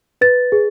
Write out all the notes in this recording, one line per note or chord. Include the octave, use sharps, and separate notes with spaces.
B4 A6
G#4